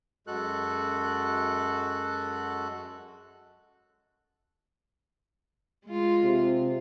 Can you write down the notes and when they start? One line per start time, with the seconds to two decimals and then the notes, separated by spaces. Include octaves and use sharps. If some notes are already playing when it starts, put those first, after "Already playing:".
0.27 F#2 G#3 F#4 A4 F#6
5.86 G#3 F4
6.23 C3